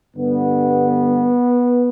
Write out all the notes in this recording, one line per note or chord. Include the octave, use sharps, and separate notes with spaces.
G2 D3 G3 B3